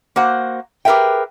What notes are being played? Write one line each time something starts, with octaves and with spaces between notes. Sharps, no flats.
A#3 F#4 C5 F#5
G4 G#4 A#4 B4 E5 G5